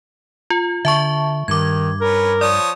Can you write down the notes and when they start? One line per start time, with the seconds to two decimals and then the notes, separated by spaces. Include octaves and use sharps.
0.50 F4
0.85 D3 E5 A5 C#6
1.48 G2 D#3 D6 G#6
2.01 C#4 A#4 B4
2.41 F3 C#5 D5 D#6